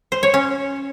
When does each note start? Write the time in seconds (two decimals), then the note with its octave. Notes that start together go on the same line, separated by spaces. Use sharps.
0.12 C5
0.23 C#5
0.34 C#4